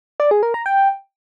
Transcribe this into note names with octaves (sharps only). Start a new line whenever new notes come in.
D5
G#4
A#4
A#5
G5